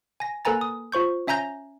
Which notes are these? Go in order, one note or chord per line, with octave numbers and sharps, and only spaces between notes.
G#5 A#6
A#3 A4 B4 G#5 A#5 A6
D#6
F4 C5 C#6 G6
C#4 E5 G#5 A#5 G6 A#6